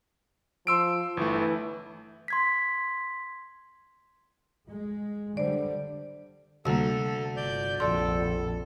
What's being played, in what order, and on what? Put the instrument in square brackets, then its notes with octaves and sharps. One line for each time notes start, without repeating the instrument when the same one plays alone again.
[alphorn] F3 [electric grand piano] C6 E6 D7
[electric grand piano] G1 A3 [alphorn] E3
[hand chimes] C6 G#6 B6
[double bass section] G#3
[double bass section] D3 G3 [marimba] C5 D5
[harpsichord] D2 [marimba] C3 G3 A#3 [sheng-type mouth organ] A4
[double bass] G1 [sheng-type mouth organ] D5 G6
[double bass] A#1 F2 [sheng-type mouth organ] A4 [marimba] D5 C6